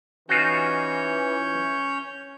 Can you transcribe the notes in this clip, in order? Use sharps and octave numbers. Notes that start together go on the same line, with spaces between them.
E3 C#4 D#4 F4 F#4 C#5 G6